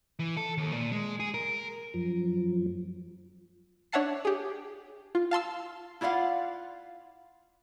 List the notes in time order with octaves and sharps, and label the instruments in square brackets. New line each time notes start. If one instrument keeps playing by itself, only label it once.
[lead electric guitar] E3
A4
D#2
A#2
G#3
G#4
A#4
[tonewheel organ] F#2 F3
[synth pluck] D4 C#5 E5 F#5 A5 C7
G4 G#4
F4
F5 A5 C6 E6
[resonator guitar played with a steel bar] E4 F4 D5 F5 F#5